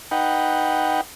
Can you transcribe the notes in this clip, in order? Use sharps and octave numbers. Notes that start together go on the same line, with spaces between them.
D#4 B4 F#5 G5